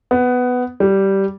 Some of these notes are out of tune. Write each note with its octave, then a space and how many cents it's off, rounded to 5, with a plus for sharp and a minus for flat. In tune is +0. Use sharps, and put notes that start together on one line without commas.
B3 +10
G3 -10